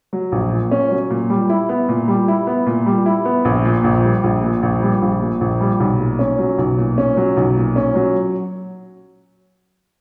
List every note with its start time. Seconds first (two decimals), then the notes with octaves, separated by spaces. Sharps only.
0.13 F#3
0.32 A#1
0.51 A#2
0.71 C#4
0.91 F#3
1.10 A#2
1.30 G3
1.50 E4
1.69 B3
1.89 A#2
2.08 G3
2.28 E4
2.47 B3
2.66 A#2
2.86 G3
3.06 E4
3.25 B3
3.45 A#1
3.65 A#2
3.84 A#1
4.04 G3
4.24 A#1
4.43 A#2
4.63 A#1
4.82 G3
5.02 A#1
5.21 A#2
5.41 A#1
5.61 G3
5.80 B1
5.99 A#2
6.19 C#4
6.39 F#3
6.58 B1
6.78 A#2
6.98 C#4
7.17 F#3
7.37 B1
7.56 A#2
7.76 C#4
7.95 F#3